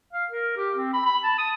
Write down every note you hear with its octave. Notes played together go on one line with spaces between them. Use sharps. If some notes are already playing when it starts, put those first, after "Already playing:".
F5
A#4
G4
C4
B5
B5
A5
D#6